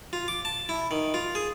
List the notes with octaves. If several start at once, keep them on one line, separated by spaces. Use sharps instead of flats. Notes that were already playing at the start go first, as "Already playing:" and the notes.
F4
D6
A5
E4
D#3
F4
G#4